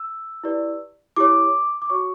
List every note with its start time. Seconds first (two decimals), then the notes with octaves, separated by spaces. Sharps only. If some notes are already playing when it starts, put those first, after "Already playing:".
Already playing: E6
0.44 E4 G4 B4 D5
1.16 E4 G4 C#5 D6
1.82 D6
1.90 F#4 C#5 C#6